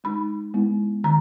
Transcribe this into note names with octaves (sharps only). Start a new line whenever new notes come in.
G#3 D#4 B5
G#3 B3 E4
D#3 A#5